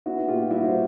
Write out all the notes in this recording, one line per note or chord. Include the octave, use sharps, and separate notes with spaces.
B3 E4 F#4
A#2 F4 G4
G3 E4 F#4
C5